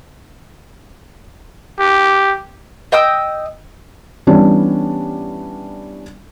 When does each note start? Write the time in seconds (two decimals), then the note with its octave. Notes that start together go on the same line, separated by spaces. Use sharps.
1.80 G4
2.92 D#5 G5 D#6 E6
4.27 E3 G3 B3 C#4 D4